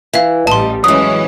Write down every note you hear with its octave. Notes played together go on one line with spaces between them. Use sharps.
E3 E5 F5
A1 G3 D#5 A5 C6
E3 F#3 G#3 C#4 D#6